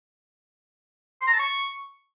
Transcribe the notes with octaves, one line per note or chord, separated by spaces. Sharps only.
C6
A#5
A5
C#6